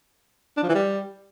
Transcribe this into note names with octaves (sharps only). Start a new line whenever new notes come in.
D4
F3
E3
G3